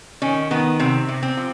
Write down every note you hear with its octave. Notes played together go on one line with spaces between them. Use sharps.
D#3 C#4
D#3 B3
C3 C4
C3
C4
F3